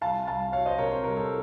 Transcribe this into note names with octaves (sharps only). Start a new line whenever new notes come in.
C2 F5 A5
C2 F5 A5
F#3 C#5 F5
C5 D#5
C3 A#4 C#5
C5
C2 A#4
A4 C5